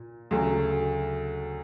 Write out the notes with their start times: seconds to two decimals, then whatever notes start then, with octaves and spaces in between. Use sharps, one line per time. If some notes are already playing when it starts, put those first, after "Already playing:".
Already playing: A#2
0.31 D2 C#3 F#3 A3